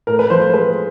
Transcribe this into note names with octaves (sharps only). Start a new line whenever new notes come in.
A2 A#4
B4
F3 C5
C5
G#3 B4